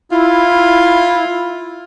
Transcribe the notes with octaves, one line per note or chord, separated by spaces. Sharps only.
E4 F4